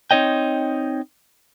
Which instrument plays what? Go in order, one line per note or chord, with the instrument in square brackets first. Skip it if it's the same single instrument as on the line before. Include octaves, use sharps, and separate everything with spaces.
[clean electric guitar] C4 D#4 C#5 D#5 G5